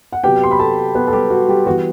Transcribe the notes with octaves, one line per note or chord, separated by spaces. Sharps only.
F#5
C3 F#3 B3 G4 G5
C6
B5
A4 A5
B3 B4
A4
G3 G4
F#4
G3 G4
E3 G3 B3 F#4